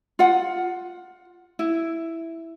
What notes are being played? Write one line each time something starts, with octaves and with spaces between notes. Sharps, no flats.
F4 F#5
E4